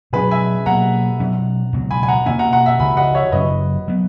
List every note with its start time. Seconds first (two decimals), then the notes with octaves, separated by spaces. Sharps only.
0.13 B2 F#3 C#4 G#4 B4
0.31 E5 G#5
0.66 B2 F#3 A#3 F#5 A#5
1.20 B2 F#3 C#4
1.73 C#2 B2 F#3
1.91 G#5 B5
2.03 G#5
2.08 F#5 A#5
2.26 B2 A#3 C#4 E5 G#5
2.39 F#5 A#5
2.53 F#5 A#5
2.66 E5 G#5
2.79 C#2 C#3 E3 G#5 B5
2.97 D#5 F#5
3.15 C#5 E5
3.32 F#2 C#3 F#3 C#4 B4 D#5
3.88 F#3 B3